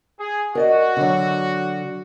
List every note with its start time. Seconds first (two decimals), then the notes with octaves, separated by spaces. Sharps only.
0.20 G#4
0.55 F#4 A#4 D5 D#5
0.97 D3 F#3